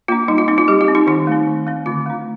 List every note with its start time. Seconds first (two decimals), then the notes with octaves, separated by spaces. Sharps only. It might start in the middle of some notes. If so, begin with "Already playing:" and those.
0.08 A#3 D4 F4
0.28 G3 D#4
0.38 F4
0.48 C4 D#4
0.58 F4
0.68 G3 G4
0.81 F4
0.88 C4
0.95 D#4
1.07 D#3 D#4
1.27 A3 C4
1.47 D#3
1.67 A3 C4
1.86 D3 F4
2.06 A3 D4